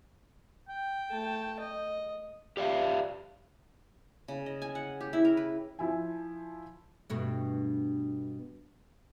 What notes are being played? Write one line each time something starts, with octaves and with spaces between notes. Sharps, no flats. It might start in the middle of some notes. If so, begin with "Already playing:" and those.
G5
A3 A5
D#5
G4 D5 E5 F5
C#3
D#5
G#5
F#5
G4
E4
A#4
B4
F3 E4 G#5
G2 B2 A3